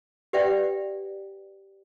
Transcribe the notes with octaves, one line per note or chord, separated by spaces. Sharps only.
G4 B4 D5 E5 F#5 G5